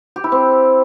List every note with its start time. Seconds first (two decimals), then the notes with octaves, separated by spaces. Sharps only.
0.16 G4
0.24 E4
0.32 C4